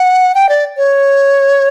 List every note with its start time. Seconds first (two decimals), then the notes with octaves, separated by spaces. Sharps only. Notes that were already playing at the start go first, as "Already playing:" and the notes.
Already playing: F#5
0.35 G5
0.49 D5
0.77 C#5